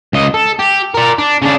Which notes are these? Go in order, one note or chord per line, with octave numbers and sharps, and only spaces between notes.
C#2 D#5
A4
G4
A#4 D5
D4
C#3 D4